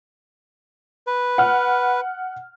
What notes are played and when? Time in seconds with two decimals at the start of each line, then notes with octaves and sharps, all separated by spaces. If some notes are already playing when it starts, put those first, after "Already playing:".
1.07 B4
1.38 F#5 F6